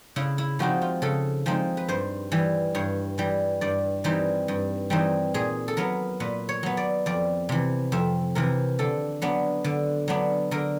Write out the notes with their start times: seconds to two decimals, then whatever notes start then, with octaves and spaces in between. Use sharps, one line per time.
0.16 C#3 E4
0.38 E4
0.59 F3 G#3 C4 D#4 F#4
0.82 F4
1.02 C#3 A4
1.46 F3 G#3 C4 D#4
1.77 B4
1.88 G2 C5
2.32 E3 G3
2.75 G2 C#5
3.18 E3 G3
3.61 G2 D5
4.04 E3 G3 C4 D#4
4.48 G2
4.90 E3 G3 C4 D#4
5.34 A#2 G#4
5.68 A4
5.77 F#3 B3 A#4
6.20 A#2 B4
6.49 C#5
6.63 F#3 B3
6.77 D5
7.06 F2 D5
7.49 C3 E3
7.92 F2 E5
8.35 C3 E3 A#4
8.79 D3 A4
9.22 F#3 B3 D4
9.64 D3
10.08 F#3 B3 D4
10.51 D3 A#4